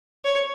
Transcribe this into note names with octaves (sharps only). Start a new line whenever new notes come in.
C#5